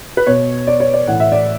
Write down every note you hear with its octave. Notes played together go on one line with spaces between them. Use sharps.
B4
B2 C#5
D5
C#5
D5
A2 E3 F#5
E5
D5